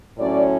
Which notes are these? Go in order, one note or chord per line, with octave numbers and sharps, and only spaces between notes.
A2 F#3 C#4 D5